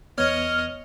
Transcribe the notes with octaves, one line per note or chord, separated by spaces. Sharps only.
E2 B3 C#5 D#5 C#6 F6